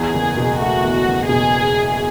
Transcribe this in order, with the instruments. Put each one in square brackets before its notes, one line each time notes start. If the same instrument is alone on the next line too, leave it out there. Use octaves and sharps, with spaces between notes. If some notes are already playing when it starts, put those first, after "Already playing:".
Already playing: [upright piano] E2 [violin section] G#4
[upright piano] F#1
B2
[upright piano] A3 [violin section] F#4
[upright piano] E2
F#1
[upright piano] B2 [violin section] G#4